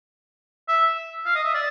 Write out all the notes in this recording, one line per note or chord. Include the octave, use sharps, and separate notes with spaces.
E5
F5
D#5
E5
D5